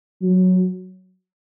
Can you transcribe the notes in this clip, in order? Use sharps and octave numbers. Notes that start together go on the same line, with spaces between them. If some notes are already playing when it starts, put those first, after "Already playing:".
F#3